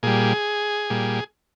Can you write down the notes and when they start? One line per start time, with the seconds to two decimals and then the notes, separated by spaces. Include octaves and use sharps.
0.03 A#2 G3 G#4
0.90 A#2 G3